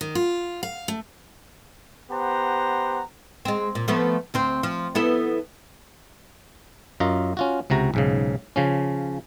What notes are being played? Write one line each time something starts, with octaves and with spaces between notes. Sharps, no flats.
D#3
F4
F5
A3
B3 G4 C5 F#5 A#5
G#3 C4
A#2
F3 A3 B3
D2 C4 C5
F3
B3 E4 A4
F#2 F4 D#5 A#5
C#4 F4 F#4
C#2 C3 F#4 A#5
B1 G#2 C#3
C#3 F3 C#4